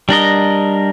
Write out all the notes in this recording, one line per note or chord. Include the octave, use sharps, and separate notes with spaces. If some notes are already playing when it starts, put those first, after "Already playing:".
G3 D4 A#4 D#5